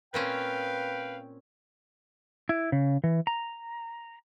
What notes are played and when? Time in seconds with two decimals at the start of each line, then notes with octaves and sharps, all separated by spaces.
0.14 A#2 C4 C#4 B4 F5 G5
2.49 E4
2.72 C#3
3.04 E3
3.27 A#5